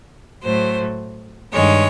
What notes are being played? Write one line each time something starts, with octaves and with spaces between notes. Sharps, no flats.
A2 F#3 A3 C5
G2 D#3 G#3 C#5